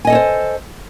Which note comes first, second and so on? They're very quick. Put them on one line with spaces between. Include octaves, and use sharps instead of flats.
G#5 D#5 A4 C#5 C5